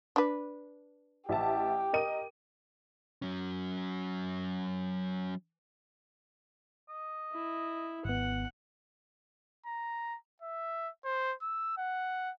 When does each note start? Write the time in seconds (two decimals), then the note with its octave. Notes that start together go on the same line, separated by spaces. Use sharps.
0.16 D4 B4
1.29 A1 G4 E5 A5
1.93 A#4 D#5 D#7
3.22 F#3 C#4
6.89 D#5
7.33 E4
8.05 G#1 B3 F#5
9.66 A#5
10.42 E5
11.05 C5
11.42 E6
11.78 F#5